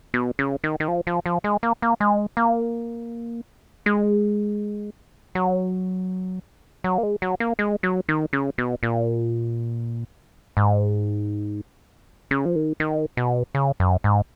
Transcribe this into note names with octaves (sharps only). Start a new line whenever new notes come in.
B2
C#3
D#3
D#3
F3
F3
F3
G#3
A#3
A#3
G#3
A#3
G#3
F#3
F#3
A#3
G#3
F#3
A#3
G#3
F#3
D#3
C#3
B2
A#2
G#2
C#3
F3
D#3
D#3
B2
C#3
F#2
G#2